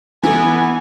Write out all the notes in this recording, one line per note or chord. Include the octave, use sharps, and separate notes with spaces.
E3 B3 E4 A4 G#5